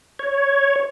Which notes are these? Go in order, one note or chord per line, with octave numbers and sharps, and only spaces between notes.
C#5